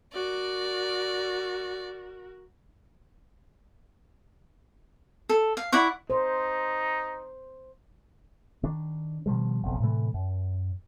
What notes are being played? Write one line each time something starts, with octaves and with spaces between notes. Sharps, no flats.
F#4 A#4 D5
A4
F5
E4 D5 F#5 C#6
D#4 C5
D#3 D4
B2 D#3 F3 G3
F#1 B1 F2
A2 C3 E3 A3
F#2